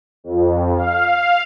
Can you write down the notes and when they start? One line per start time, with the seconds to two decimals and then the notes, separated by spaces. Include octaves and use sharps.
0.24 F2
0.76 F5